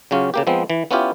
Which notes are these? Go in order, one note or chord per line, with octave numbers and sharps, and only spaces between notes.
C#3 F#3 C#4 F4 G4
C#3 A#3 G4
F3 G#3 B3 C4
E3
B3 C#4 E4 F4 G4